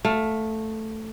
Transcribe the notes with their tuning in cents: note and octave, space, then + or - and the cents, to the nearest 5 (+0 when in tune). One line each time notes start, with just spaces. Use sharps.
A3 +0 F5 +20